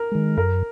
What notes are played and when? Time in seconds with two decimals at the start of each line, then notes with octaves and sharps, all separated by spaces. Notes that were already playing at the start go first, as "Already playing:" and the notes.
Already playing: A#4
0.12 D#3 G#3
0.37 F#2 A#4